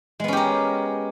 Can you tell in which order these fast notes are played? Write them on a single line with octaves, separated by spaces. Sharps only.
G#3 B3 C#4 G4 A#4